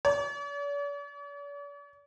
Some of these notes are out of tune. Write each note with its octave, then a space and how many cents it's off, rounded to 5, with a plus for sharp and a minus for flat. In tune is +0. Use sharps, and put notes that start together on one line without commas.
D5 -45